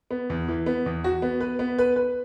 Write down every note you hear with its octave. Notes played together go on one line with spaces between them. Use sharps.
B3
E2
E3
B3
E2
F#4
B3
B4
B3
B4
B4